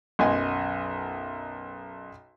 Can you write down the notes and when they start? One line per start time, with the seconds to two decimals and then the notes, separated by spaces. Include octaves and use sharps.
0.19 B1 F#2 D#5 G#5 C6